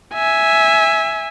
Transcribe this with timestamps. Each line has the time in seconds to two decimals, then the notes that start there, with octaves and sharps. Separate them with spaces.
0.14 E5 G#5